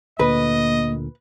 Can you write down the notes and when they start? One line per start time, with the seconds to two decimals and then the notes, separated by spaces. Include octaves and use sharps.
0.19 D2 A#2 D3 A#3 B4 D#5